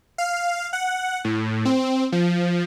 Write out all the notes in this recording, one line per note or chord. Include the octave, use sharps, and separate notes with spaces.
F5
F#5
A2
C4
F3